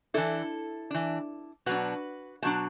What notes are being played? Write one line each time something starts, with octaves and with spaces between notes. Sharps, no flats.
E3 D4 E4 A4
E3 D4
B2 F#3 D4 F#4 B4
B2 F#3 D4 A5